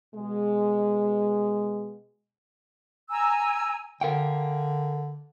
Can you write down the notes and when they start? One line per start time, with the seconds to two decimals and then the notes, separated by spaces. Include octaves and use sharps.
0.15 B2 G#3
3.09 G#5 A#5 E6
4.01 D3 A#4 F5 G5